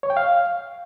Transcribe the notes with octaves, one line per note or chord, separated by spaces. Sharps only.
C#5
G5
F5